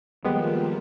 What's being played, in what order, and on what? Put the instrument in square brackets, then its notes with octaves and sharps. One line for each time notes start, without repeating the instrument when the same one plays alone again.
[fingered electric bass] D#3 F3 G3 [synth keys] G#3 B3 G4 [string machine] A#3 F4